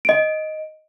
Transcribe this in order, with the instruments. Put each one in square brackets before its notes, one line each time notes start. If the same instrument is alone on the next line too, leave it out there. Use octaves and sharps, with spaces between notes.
[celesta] D#5 D7